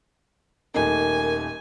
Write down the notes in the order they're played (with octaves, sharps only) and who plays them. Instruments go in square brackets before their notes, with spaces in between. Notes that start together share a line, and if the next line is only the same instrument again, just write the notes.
[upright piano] D#1 A3 D#4 [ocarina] A#4 [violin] G#5